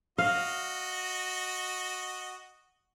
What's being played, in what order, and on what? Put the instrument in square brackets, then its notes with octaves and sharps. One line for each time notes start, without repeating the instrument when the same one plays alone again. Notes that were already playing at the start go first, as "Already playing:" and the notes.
[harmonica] F#4 D#5 [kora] F5